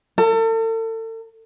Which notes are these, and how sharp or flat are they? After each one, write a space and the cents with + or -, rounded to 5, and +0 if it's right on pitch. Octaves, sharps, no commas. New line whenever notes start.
A4 +40